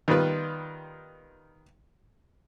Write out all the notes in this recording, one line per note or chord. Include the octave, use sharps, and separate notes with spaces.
D#3 G3 B3 F4 B4